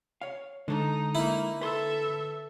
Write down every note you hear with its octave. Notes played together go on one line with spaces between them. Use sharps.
C#5 F5
D3 G#3 D#4 A4
A#3 D#4 E4
A4 B4 E5 C6